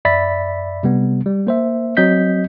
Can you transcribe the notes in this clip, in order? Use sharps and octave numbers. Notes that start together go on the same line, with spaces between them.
F#2 D5 E5 B5 A6 B6
C3 G3 B3
G3
A#3 C5 E5
F#3 C4 D#5 G6 B6